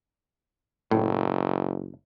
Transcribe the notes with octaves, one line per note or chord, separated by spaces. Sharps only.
F#1 A2